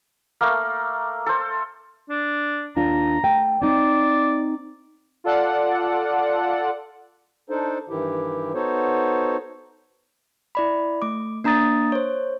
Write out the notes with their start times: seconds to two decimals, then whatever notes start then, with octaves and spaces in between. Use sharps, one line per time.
0.41 A3 A#3 F6
1.26 A4 C5
2.09 D4
2.76 D#2 D4 F4 A#5
3.23 A3 G5
3.62 C4 D#4 D5
5.24 F4 A4 D5 F#5
7.50 D4 D#4 A4 C5
7.89 G2 D#3 E3 E4 G4
8.54 B3 D#4 F#4 A4 C5 C#5
10.55 E4 D5 B5
11.02 A3 D6
11.44 A#3 D4 A#5 D#6 A6
11.92 C5 C#5